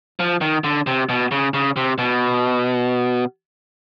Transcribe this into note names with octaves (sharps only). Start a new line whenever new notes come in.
F3
D#3
D3
C3
B2
C#3
C#3
C3
B2